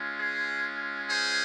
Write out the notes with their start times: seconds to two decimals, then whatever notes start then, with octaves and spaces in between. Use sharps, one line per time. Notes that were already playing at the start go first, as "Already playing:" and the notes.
Already playing: G#3 C#4 F4
0.16 G#4
1.09 G#4 C5